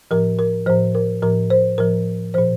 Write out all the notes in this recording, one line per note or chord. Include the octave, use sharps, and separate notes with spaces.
A2 F3 A#4
A#4
A2 F3 C5
A#4
A2 F3 A#4
C5
A2 F3 A#4
A#2 F3 C5